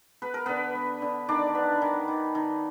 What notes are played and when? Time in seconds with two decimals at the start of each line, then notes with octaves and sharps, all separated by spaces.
0.22 B3 B4
0.34 A#4
0.46 D3 B3 B4
0.75 B3
1.02 D3
1.28 D#3 D4 D5
1.55 B3
1.82 D#3
2.08 D#3
2.35 D#3